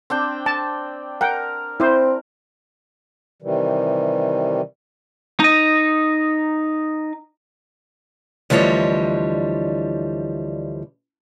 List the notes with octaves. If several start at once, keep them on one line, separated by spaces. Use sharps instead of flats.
C4 D4 G5
A5
A#4 F#5 G5
C4 E4 C5
C3 D#3 E3 G3
D#4 D#5
D2 E3 F3 G3 C#5 D#5